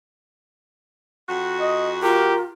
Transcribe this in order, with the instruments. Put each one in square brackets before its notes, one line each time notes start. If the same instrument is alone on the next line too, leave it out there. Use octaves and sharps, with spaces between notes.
[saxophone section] F2 F#4
[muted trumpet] D#5
[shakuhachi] F4 [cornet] G4 [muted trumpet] A#4